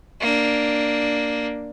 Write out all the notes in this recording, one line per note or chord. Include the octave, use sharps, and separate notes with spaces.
A#3 D4